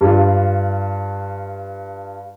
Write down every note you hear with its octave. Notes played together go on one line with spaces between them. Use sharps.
G2 F4